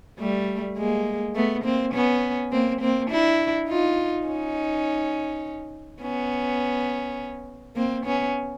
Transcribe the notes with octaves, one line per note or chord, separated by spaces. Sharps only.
G3 A3
G#3 A#3
A3 B3
A#3 C4
B3 C#4
A#3 C4
A#3 C4
D4 E4
D#4 F4
C#4 D#4
B3 C#4
A#3 C4
B3 C#4